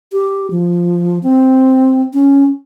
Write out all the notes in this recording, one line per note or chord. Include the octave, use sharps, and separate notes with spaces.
G4
F3
C4
C#4